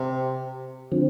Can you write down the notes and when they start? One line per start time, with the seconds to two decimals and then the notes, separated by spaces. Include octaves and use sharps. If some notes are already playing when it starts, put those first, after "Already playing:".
Already playing: C3
0.92 D3 F3 C4